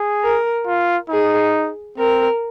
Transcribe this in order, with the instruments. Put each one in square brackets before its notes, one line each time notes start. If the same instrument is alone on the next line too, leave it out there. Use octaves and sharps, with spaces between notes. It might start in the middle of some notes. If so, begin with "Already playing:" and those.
Already playing: [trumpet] G#4
[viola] A#4
[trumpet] F4
[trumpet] D#4 [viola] G#4
[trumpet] C4 [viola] A#4